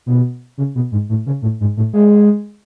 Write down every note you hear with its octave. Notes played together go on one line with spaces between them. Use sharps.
B2
C#3
B2
G#2
A2
C#3
A2
G#2
A2
G#3